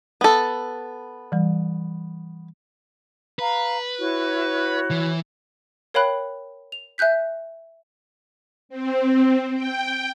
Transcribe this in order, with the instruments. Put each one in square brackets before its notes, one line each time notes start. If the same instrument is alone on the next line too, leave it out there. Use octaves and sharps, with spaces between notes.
[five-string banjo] B3 A4
[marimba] E3 G3
[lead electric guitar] B4 [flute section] F5 A#5
[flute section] E4 F#4 C#5
[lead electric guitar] E3
[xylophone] A#4 C#5 F5 G5 B5 F#6
F7
E5 G#5 F#6 G6 B6
[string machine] C4
G5